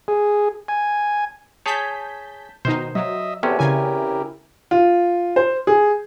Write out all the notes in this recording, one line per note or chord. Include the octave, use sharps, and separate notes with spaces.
G#4
G#5
G#4 C#5 A5 G6 B6
B2 D#3 D#4 C5
F#3 D#5 E5
E2 C3 B3 C#4 G4 A4
C#3 E4 G4 A#4 G#5
F4
C5
G#4